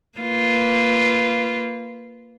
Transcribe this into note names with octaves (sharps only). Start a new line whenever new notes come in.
A#3 F4 B4